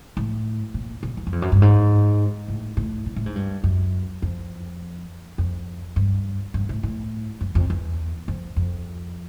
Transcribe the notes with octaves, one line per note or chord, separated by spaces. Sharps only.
A2
A#2
A#2
E2
F#2
F2
F#2
G2
G#2
A2
A2
A#2
A2
G#2
G2
F#2
F2
F2
G2
G2
A2
A2
F#2
F2
E2
F2
F2